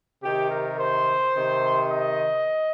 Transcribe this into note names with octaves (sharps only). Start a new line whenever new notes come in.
C3 D#3 G4
A#4
C5
C3 D#3
D#5